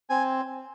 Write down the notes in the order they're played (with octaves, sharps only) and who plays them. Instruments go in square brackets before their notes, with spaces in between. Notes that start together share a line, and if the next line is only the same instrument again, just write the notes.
[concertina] C4 G#5